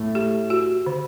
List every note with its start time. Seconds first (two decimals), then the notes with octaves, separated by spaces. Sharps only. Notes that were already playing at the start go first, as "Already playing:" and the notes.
Already playing: A2 A3
0.15 G4
0.50 F#4
0.87 D3